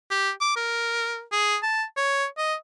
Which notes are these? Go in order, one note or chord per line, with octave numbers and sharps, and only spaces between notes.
G4
D6
A#4
G#4
A5
C#5
D#5